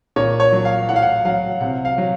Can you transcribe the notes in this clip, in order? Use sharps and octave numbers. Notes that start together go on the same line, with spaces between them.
A#2 C#5
C#5
F#3
F5
A2 F#5
F5
F#5
F#3 F5
C3 F#5
F5
F#3